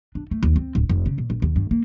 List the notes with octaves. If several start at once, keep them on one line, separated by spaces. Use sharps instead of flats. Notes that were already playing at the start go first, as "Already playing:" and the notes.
D4
A3
D#2
C4
D1
F1
C#3
A#2
A#1
D#2
G2
A#3